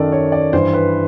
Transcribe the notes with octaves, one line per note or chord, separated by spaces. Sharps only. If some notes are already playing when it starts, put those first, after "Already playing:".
Already playing: F#2 D#3 A4 D5
C#5
D5
G2 E3 C5
B4